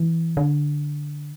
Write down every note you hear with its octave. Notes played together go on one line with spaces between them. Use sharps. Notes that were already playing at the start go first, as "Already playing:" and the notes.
Already playing: E3
D3